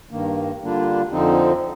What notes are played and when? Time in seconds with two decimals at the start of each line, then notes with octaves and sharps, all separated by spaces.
0.11 G2 D#3 A#3
0.62 D3 G3 A#3 D4 F4
1.12 F2 D3 F3 C4 D#4